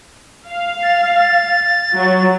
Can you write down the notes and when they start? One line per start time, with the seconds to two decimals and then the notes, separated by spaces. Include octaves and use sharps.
0.52 F5
0.83 A6
1.16 A6
1.95 F#3